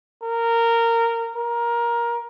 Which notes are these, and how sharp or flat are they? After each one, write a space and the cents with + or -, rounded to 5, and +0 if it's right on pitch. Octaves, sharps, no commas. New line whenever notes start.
A#4 -15
A#4 +15